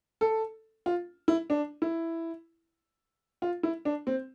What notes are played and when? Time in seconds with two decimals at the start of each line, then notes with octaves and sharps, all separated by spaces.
0.21 A4
0.86 F4
1.28 E4
1.50 D4
1.82 E4
3.42 F4
3.63 E4
3.85 D4
4.07 C4